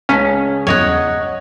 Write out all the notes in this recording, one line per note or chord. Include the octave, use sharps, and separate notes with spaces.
C#2 C#4 A5 A#5 F6 B6
E2 G2 F#3 C#5 D#5 F#5